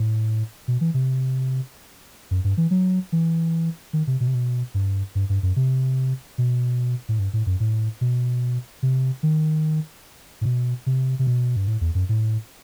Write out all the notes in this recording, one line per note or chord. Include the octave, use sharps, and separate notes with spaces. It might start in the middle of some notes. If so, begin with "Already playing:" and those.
Already playing: A2
B2
E3
C3
F#2
G2
E3
F#3
E3
D#3
C3
B2
C3
B2
G2
G2
G2
F#2
C3
B2
A2
G2
A2
F#2
A2
B2
C3
D#3
A2
B2
C3
C3
B2
G2
A2
E2
F#2
A2